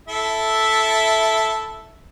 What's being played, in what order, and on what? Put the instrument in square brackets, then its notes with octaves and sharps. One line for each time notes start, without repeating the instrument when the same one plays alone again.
[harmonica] E4 A4 E5